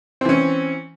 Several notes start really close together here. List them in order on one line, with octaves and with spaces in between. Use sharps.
C4 E3 C#4